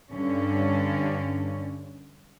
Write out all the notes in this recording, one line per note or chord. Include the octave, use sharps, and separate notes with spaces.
G2 D3 C#4